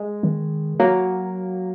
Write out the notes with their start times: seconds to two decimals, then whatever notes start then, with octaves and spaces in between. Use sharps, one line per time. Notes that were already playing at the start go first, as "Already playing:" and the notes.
Already playing: G#3
0.23 D#3
0.79 F#3 A#3